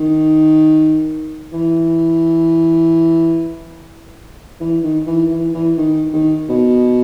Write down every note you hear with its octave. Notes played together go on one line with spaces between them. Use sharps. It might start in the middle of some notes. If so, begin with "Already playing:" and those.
Already playing: D#3
E3
E3
D#3
E3
E3
E3
D#3
D#3
B2